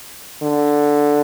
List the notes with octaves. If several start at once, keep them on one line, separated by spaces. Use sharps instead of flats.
D3